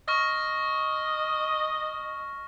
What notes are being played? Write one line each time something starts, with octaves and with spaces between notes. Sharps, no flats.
D#5 C#6 F6 A#6